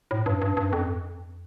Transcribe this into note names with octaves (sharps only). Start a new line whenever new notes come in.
A2
G2
G2
G2
F2